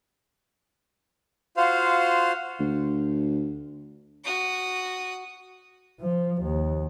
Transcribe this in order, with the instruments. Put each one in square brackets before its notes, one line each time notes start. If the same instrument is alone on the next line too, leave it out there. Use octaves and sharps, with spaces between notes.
[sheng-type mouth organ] F4 F#4 C5 F5
[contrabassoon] D2
[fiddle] F#4 D#6
[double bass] F3
D#2